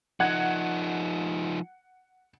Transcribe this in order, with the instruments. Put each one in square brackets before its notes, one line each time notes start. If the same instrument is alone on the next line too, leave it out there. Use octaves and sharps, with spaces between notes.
[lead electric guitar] F3 D#4 [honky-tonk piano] F#5 G#6